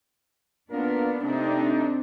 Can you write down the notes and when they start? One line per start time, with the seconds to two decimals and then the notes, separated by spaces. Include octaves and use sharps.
0.71 A#3 B3 D4 F4 A#4
1.23 C3 A3 C4 D4 D#4